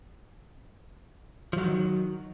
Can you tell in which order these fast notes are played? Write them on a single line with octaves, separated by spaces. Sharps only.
F3 F#3 D#3